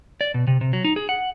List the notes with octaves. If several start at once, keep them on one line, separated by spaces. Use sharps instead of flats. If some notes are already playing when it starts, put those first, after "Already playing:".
D5
B2
C3
C3
F#3
D#4
G#4
F#5